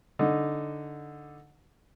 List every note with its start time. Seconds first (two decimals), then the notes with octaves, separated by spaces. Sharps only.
0.19 D3 D#4